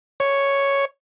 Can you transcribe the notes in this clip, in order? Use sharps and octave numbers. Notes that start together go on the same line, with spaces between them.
C#5